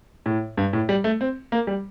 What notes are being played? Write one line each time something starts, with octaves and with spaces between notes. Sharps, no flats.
A2
G2
A2
G3
A3
C4
A#3
G3